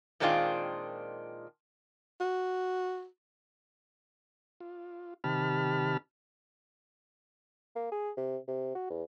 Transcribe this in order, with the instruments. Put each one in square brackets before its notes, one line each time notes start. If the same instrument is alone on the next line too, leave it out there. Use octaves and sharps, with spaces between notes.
[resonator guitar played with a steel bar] A#2 D#3 G#3 C4 D4 F4
[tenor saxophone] F#4
[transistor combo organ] F4
C3 D#3 G4 A5 B5 F6
[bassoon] A#3
G#4
C3
C3
F#4
E2